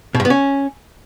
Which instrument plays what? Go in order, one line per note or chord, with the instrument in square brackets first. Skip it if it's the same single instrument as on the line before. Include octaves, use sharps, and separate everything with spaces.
[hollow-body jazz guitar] B2
G2
B3
C#4